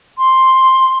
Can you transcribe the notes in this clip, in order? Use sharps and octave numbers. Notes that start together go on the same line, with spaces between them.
C6